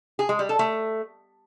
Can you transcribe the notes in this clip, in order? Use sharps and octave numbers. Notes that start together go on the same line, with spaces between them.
G#4
G#3
G3
A4
A3